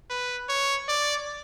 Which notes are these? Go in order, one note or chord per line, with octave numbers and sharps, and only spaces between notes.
B4
C#5
D5